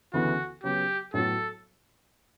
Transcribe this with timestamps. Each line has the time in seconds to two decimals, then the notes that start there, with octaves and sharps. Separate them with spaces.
0.13 D2 C#3 E3 B3 F#4
0.63 C#3 F#3 B3 G4
1.14 A2 F#3 B3 F#4 A4